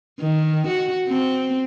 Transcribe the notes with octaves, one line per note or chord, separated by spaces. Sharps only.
D#3
F#4
C4